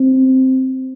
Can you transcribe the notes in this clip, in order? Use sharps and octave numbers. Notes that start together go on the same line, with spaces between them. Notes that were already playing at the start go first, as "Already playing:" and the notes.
Already playing: C4